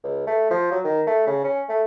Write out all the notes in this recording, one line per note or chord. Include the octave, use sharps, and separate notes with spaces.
C#2
A3
F3
F#3
D#3
A3
C#3
C#4
A3